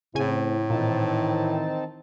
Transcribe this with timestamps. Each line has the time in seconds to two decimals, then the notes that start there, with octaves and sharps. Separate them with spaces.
0.15 A2 C#3 A3 C4 C#4 E4 G#5
0.70 A#2 D#3 E3 C4 D#4 A5